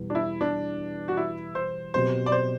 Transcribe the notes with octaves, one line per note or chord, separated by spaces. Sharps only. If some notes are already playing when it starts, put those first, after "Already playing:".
Already playing: E2 B2 G3
D4
E4
D4
F#4
E4
C5
B2 F#3 C4 G4 C5
D5
C5